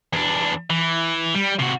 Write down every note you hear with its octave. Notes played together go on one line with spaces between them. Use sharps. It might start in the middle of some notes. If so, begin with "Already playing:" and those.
E2 D4
E3
G3
C3 F#4